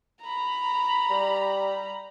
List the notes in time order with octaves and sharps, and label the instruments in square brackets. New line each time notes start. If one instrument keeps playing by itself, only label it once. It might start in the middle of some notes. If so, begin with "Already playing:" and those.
[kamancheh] A#5 B5
[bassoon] G3